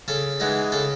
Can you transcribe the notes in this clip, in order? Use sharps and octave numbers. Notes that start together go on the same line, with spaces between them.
C#3 A4
E3 G#3 B3 D#4
C#3 A4